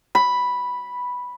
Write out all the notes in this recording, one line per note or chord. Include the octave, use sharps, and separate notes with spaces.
B5